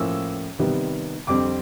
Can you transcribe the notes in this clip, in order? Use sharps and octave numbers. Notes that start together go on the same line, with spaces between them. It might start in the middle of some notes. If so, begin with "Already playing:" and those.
Already playing: A2 F3 A#3 C#4 E6
C3 D#3 G3 B3
F2 D3 G3 C4 D6